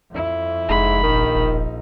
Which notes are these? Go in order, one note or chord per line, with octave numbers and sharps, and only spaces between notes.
F2 E4
F1 G#2 B5
A#1 D#3 D#4
E1